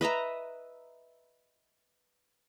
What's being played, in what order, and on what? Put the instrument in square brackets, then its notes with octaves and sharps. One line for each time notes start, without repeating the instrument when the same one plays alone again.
[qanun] B4 D#5 E5 A#5